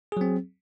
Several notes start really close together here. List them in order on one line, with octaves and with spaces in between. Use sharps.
G#4 F#3 C4